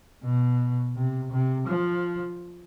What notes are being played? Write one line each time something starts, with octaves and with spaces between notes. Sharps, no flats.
B2
C3
C3
F3